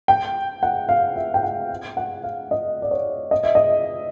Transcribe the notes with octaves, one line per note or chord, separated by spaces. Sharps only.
G5
F#5
F5
E5
G5
F#5
F#5
F5
D#5
D5
C#5
D#5
E5
D#5